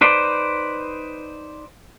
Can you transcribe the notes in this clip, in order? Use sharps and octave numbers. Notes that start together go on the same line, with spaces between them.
D#4 B4 C5 D5